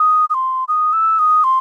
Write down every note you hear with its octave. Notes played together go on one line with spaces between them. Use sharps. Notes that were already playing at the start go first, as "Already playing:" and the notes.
Already playing: D#6
D#6
C6
D#6
E6
D#6
C6